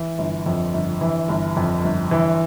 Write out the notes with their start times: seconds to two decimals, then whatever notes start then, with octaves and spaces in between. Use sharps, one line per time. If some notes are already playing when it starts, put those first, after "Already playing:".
Already playing: E3
0.18 G1
0.46 F2
0.73 G1
1.01 E3
1.29 G1
1.56 F2
1.83 G1
2.11 E3